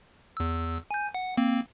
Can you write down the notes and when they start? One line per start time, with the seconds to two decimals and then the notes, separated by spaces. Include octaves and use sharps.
0.37 E2 E6
0.91 G#5 G6
1.14 F#5
1.37 A#3 C4